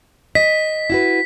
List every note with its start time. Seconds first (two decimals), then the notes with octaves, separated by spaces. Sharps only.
0.35 D#5 B6
0.90 E4 F#4 B4